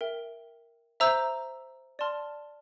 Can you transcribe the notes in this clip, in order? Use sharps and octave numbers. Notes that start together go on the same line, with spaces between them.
A#4 E5 G5
C5 E5 A#5 E6 G6
D5 A5 C6 F6